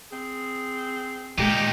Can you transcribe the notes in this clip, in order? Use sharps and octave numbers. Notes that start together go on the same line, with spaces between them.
C4 G#4
A#2 G#3 D#4 G4